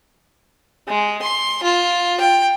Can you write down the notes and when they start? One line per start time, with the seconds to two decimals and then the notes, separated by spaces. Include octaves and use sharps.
0.88 G#3
1.22 C6
1.63 F4
2.21 G5